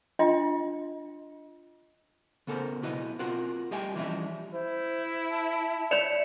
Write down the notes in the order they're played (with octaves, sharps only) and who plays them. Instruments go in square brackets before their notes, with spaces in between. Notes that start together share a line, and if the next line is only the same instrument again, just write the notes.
[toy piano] D4 F4 D#5 G5 C6
[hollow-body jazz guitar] C#3 B3 A4 A#4 C5
B1 B2 E4 F#4 B4 D#5
C4 F4 F#4 A#4 F#5
G3 G4 D#5 E5 G5 G#5
E3 F3 G3 C#4 D#5 E5
[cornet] E4 [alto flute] C5
[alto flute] A5
[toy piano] C#5 D5 [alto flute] E5 [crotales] C#7 E7 F7